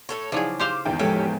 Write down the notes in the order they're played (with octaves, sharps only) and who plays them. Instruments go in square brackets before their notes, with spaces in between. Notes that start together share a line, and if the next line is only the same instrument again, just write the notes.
[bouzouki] A2 A4 C#5
[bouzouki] C#3 [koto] F3 F#3 G#4 [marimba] D#4 E4 [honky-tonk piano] D5
[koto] G4 C5 F5 [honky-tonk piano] C6 D6
[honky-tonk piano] G#1 E2 G5
[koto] A2 [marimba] F3 G#3 [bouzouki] C#4 G4 E5